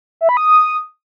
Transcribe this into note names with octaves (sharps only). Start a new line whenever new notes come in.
E5
B5
D#6